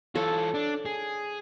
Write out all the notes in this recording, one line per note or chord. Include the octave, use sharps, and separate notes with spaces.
E3 F4 A4 C#5
D4
G#4